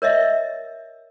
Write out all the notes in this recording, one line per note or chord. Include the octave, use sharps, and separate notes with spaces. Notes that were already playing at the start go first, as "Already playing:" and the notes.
A#4 C#5 D#5 E5